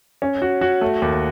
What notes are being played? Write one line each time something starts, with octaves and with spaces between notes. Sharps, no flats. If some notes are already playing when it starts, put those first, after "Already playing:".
C#4
F#4
F#4
A3
D#2